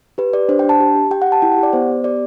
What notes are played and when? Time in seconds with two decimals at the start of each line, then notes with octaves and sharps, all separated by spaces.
0.18 G4 B4
0.33 G4 D5
0.49 D4 C5
0.59 G5
0.64 D4
0.69 A5
0.80 G4
0.95 G4
1.11 G4 G5
1.22 F#5
1.27 G4
1.32 A5
1.42 E4 G5
1.52 F#5
1.58 G4 D5
1.73 B3 C5
1.90 B3
2.04 G4 D5